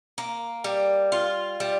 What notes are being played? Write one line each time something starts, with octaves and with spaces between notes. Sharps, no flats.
A#3
G3
F4
G3